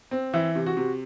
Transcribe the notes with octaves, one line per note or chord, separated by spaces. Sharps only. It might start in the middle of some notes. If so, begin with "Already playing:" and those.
C4
E3 E4
C3
F#4
C3